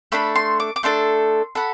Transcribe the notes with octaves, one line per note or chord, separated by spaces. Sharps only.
A3 D4 A4 B5
C6
D6
D6
A3 D4 A4 C6
F#4 A4 B5